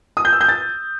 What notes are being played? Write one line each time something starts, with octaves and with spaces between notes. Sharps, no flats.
D#6
G6
E6
G6
A6